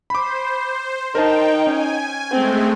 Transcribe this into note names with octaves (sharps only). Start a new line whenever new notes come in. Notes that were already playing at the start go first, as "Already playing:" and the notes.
C5 B5 D6
D#4 A#4 C5 G5 A5
C#4 G#5
G#3 A3 C4